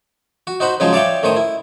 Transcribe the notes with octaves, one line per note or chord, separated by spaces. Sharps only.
F#4
D#4 F#4 C5 F#5 B5
C#3 F3 F#3 G#3 D#4 G#4
C#5 D5 E5 F5 G5 C#6
A2 D#3 C5 C#6 D#6
E4